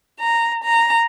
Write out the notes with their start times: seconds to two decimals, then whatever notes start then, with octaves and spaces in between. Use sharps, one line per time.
0.19 A#5
0.61 A#5